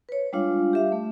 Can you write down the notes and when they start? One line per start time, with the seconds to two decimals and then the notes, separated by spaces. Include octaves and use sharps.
0.09 B4 C#5
0.33 G3 G#3 D4 F4 F5
0.73 G4 E5 F5
0.92 A3